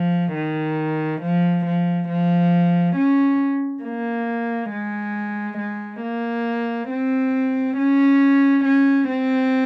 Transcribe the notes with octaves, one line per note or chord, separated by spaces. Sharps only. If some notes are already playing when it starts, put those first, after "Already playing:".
Already playing: F3
D#3
F3
F3
F3
C#4
A#3
G#3
G#3
A#3
C4
C#4
C#4
C4